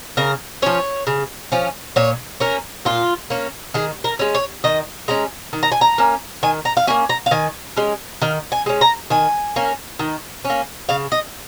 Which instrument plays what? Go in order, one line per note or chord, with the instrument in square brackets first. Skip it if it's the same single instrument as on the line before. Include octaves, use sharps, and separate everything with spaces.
[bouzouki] C#3 A#4
F3 C#4 C#5
C#3
F3 C#4
A#2 C#5
A#3 C#4 A#4
A#2 F4
A#3 C#4
D#3 G#4
A#4
G#3 C#4
C#5
D#3 D#5
G#3 C#4 A#5
D#3
A#5
G#5
A#5
A#3 C#4
D#3 G#5
A#5
F5
A#3 C#4 G#5
A#5
F5
D#3 G#5
G#3 C#4
D#3 F5
G#5
G#3 C#4
A#5
D#3 G#5
A#3 C#4
D#3
C#4
A#3
C#3 F5
D#5